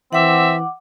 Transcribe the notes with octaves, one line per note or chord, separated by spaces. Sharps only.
E3 C4 E5 F#5 D6